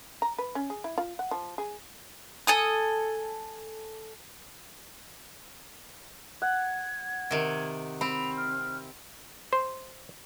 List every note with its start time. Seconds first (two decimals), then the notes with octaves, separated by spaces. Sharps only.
0.22 A#5
0.38 B4
0.55 C#4
0.70 G#4
0.84 E4
0.98 F4
1.19 F#5
1.31 F3
1.58 G#4
2.47 A4 G#5 D#6
6.42 F#5 G#6
7.31 C3 D#3
8.01 C4 B5 F7
8.37 F6
9.53 C5